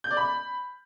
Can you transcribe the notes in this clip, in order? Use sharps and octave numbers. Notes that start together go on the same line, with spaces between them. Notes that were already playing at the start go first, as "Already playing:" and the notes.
G6
D5
B5